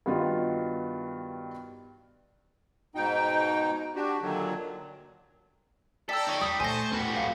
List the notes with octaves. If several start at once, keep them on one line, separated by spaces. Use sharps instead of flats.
G2 D#3 B3 F4 F#4
G#2 B2 D#4 G5
D4 F#4 G4
A#2 D3 D#3 F#3
A4 D5 G5 A#5 E6 B6
D#4 C#5
E2 G3 D#6
A#2 D3 A3 C5 G#5 A5 C#6 A#6
E2 A2 G3 B3 F#4
C2 G#2 F5